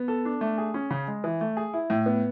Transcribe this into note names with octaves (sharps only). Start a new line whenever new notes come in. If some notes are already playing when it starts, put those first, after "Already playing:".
Already playing: B3
A4
D4
A3
G#4
C#4
C#3
G#3
E3
A3
G#4
E4
A2
B3